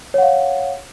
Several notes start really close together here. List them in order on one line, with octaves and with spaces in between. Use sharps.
C#5 F#5 F5